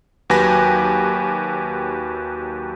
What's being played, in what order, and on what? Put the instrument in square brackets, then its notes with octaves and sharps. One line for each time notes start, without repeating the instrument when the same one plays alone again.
[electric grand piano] D#2 F#3 G4 B4 G#5 A#6